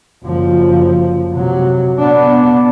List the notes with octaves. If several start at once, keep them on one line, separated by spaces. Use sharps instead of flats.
F#1 F3
C3 F#3
B3 D4